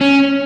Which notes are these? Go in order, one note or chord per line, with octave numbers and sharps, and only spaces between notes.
C#4